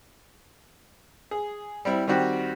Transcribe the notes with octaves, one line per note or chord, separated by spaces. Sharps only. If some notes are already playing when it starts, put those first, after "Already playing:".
G#4
G3 C4 E4
D#3 G3 C4 F#4 G4